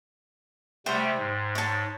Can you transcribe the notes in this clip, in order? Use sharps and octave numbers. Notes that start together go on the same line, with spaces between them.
C3 G3 A3 C5 G5
G#2
C#5 A5